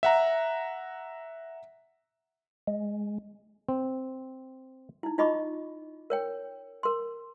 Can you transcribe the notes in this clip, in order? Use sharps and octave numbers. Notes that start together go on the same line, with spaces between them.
E5 F#5 A#5
G#3
C4
D#4 E4
D#4 F4 D#5 B5 C#6 D6
A#4 C#5 G5
A#4 C6